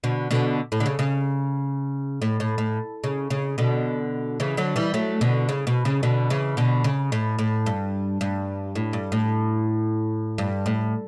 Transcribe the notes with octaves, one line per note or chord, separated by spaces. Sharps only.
B2 D3
B2 D3
A2
D3
C#3
C#3
A2
A2
A2
C#3
C#3
B2 D3
C#3 E3
D3 F#3
E3 G3
F#3 A3
B2 D3
C#3
B2
C#3
B2 D3
C#3 E3
B2 D3
C#3
A2
A2
G2
G2
A2
G2
A2
G2
A2